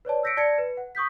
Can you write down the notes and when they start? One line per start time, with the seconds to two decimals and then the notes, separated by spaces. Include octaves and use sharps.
0.05 B4 C#5 D5 A5
0.23 E6 G6 A#6 B6 C#7 D7
0.37 D5 A5 G#6 A#6 C#7
0.58 B4
0.77 F#5
0.95 C#6 D#6 G6 B6